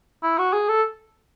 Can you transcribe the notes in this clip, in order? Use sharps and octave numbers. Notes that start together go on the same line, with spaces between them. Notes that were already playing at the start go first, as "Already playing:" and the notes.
E4
F#4
G#4
A4